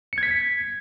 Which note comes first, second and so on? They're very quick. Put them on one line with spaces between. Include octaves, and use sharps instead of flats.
C#7 G#6 B6